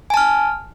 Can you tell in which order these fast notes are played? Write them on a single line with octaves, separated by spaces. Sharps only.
G#5 A5 F6